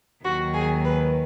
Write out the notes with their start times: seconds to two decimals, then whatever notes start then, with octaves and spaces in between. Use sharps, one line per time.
0.24 D#2 D#3 F#3 F#4
0.54 G#4
0.84 B4